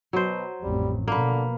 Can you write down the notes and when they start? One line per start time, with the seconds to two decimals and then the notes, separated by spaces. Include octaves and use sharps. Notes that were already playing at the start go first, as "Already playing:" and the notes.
0.13 B2 F#3 C5
0.63 A1 F2 G3
1.08 B2 D3 F3 A#3 B4